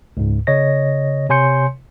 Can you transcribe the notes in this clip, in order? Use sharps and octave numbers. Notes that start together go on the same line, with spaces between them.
C#2 G#2
C#3 C#5 D#5 A#6
C3 C#5 G#5 C6 G6 C#7